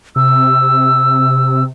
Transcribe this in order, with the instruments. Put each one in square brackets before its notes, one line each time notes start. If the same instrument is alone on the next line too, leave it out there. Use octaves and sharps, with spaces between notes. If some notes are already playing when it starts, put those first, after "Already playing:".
[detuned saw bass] C3 [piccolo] E6